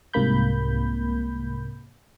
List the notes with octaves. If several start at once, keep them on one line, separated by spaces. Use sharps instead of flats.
C2 G#2 C3 A#3 B5 G6